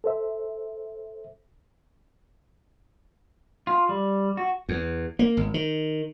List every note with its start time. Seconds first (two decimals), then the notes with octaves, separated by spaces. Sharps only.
0.04 A4 C5 E5
3.67 F4
3.89 G3
4.37 F#4
4.69 E2
5.19 A#3
5.37 G#1
5.54 D#3